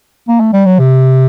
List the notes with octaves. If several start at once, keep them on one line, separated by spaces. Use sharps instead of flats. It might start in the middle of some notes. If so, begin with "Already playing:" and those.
A#3
A3
G3
F#3
C3